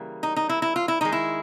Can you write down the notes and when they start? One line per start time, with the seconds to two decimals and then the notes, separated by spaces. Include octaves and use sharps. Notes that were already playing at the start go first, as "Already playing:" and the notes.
Already playing: C#3 E3 G3 A#3
0.23 D#4
0.36 D#4
0.49 E4
0.62 E4
0.76 F4
0.88 E4
1.01 D#3 G#3 D#4
1.12 E4